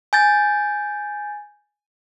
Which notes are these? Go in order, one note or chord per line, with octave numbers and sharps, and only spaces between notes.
G#5 G6 A6